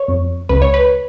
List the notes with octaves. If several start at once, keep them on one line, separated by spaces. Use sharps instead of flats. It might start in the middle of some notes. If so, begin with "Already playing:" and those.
Already playing: C#5
F2
C#2 B4
C#5
B4